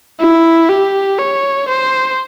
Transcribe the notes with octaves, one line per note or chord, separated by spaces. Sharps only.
E4
G4
C#5
C5